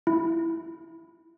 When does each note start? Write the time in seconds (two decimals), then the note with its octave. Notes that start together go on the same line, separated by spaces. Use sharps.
0.07 E4